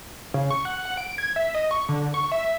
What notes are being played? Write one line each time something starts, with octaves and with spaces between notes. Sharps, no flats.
C#3
C#6
F#5
F#5
D7
G#6
E5
D#5
C#6
D3
C#6
E5